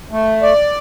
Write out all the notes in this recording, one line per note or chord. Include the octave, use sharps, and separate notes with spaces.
A3
D5